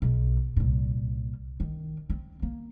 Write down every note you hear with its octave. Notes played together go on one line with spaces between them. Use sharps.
B1
C2 A#2
D#3
C4
A#3